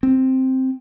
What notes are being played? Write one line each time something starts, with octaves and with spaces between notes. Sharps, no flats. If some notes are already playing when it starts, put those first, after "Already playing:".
C4